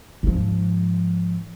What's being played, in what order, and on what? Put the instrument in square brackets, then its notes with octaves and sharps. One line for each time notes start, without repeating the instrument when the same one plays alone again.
[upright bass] G#2 F3